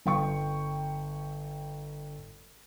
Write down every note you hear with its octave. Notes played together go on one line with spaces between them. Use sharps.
G1 G5 C#6